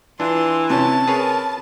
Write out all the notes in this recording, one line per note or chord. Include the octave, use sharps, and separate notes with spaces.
E3 D4 F4 C6
C3 C#4 A5
G#4 A#4 B4 C#5